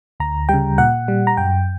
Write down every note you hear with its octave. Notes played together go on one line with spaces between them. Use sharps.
D2 A#5
C#3 G3 G5
A#2 F#5
G3
A#5
F#2 G5